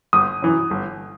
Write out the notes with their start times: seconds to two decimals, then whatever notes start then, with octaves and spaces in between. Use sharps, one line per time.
0.13 G1 D#6
0.42 F#2 E3
0.71 G1